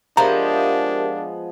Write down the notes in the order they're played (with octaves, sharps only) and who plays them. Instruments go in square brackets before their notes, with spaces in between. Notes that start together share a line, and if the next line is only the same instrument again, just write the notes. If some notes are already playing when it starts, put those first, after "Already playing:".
[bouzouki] F3 G#3 B3 [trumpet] D4 [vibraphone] G4 A#4 E5 [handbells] A#5